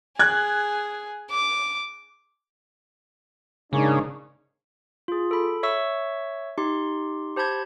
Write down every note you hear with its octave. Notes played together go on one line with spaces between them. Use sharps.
G#4 F#6 G#6
D6
G#2 C#3 A#3 D4 D#4 G#4 C#5
F4 G#4
A4 B5
C#5 E5 C#6 E6
D#4 G4 C6
G4 C5 A5 B5 G6 G#6